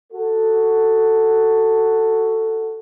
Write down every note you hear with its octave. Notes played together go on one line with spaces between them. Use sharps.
F#4 A4